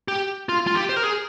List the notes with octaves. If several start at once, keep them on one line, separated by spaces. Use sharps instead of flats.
G4
F4
F4
G4
C5
A#4
G#4